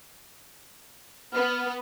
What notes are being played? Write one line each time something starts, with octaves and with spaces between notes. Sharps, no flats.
B3 F6